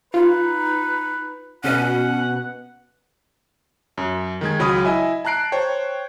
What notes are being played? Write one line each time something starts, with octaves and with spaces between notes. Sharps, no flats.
D#4 F4 B4
B2 C#4 F#5
F#2
D#3 G#3 G#6
C#2 F#3 B5 D#6
E4 D#5 E5 G#5
A5 A#5 F#6 C7 D7
C5 C#5 G5